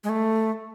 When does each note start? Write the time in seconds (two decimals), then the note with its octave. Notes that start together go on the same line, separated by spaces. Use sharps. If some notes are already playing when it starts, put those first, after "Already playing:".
0.04 G#3
0.09 A3